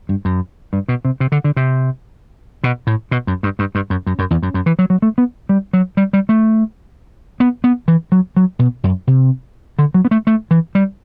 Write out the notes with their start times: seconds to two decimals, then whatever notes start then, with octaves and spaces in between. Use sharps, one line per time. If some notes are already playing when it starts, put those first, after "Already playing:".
0.09 G2
0.25 F#2
0.73 G2
0.88 B2
1.05 C3
1.20 C3
1.32 D3
1.44 D3
1.57 C3
2.64 B2
2.87 A2
3.11 B2
3.27 F#2
3.43 G2
3.59 G2
3.75 G2
3.90 F#2
4.07 F#2
4.19 F#2
4.31 E2
4.43 F#2
4.54 F#2
4.66 E3
4.79 F#3
4.90 F#3
5.02 A3
5.18 B3
5.49 G3
5.73 F#3
5.97 G3
6.13 G3
6.29 A3
7.40 B3
7.64 B3
7.88 E3
8.12 F#3
8.37 F#3
8.59 B2
8.84 F#2
9.07 C3
9.79 D3
9.94 F#3
10.05 B3
10.11 A3
10.27 A3
10.51 E3
10.75 G3